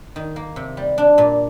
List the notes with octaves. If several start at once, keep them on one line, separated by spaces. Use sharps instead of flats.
D#3
A#3
C3
G3
D4
A#2